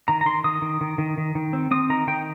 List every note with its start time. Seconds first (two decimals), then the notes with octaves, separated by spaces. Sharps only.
0.08 D#3 A#5
0.21 A#5
0.26 D#3 C6
0.44 D#3 D#6
0.62 D#3
0.81 D#3
0.98 D#3
1.18 D#3
1.35 D#3
1.53 C4
1.71 C4 D#6
1.90 D#3 A#5
2.07 D#3 G5